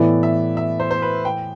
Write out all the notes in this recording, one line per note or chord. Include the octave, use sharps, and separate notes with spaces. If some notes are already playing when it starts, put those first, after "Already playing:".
Already playing: A2 E3 B3 E4 D5
E5
E5
C5
C5
B4
G5